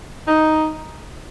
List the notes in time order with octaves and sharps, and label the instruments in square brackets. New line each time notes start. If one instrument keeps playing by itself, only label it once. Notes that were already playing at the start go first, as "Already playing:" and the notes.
[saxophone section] D#4